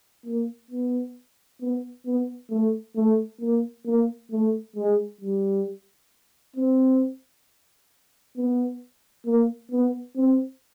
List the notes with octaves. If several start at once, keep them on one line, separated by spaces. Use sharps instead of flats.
A#3
B3
B3
B3
A3
A3
A#3
A#3
A3
G#3
G3
C4
B3
A#3
B3
C4